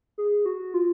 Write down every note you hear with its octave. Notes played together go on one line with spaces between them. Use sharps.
G#4
F#4
F4